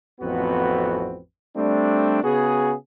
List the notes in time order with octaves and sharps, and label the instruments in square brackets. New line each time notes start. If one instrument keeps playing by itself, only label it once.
[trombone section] A1 F2 B3 C4 F#4 B4
G3 A3 C4 D4
C#3 B3 F#4 G#4